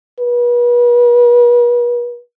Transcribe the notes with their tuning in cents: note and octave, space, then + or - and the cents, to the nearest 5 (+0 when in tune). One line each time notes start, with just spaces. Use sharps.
B4 -40